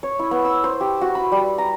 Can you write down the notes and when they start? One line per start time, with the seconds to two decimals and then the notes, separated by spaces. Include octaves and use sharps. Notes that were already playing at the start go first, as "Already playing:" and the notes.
0.03 C#5
0.19 E4
0.31 B3
0.45 E6
0.64 C5
0.81 G4
1.01 F#4
1.15 B5
1.32 G3
1.58 A#5